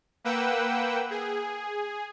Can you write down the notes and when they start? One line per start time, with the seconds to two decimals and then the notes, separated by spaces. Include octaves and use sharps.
0.24 A#3 B4 F#5 G5 E6
1.11 G#4